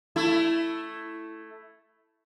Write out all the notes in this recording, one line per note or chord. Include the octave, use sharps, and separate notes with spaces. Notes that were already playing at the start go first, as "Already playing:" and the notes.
A3 E4